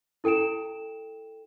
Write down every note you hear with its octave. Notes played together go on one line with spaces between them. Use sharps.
E4 A4 G5 D7 E7